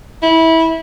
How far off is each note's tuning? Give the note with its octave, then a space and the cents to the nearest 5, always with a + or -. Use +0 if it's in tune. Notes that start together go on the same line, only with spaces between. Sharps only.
E4 -20